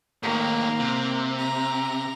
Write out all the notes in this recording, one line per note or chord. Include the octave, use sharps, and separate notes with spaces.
A2 D#3 A#3
C3
A#5